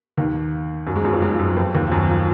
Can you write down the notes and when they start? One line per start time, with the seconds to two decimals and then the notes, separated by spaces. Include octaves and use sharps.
0.17 D#2 D#3
0.87 F#2 F#3
0.96 G#2 G#3
1.05 F#2 F#3
1.13 F2 F3
1.22 G#2 G#3
1.33 F3
1.39 F#2 F#3
1.57 F2 F3
1.74 D#2 D#3
1.87 F3
1.92 F#2 F#3
2.09 F3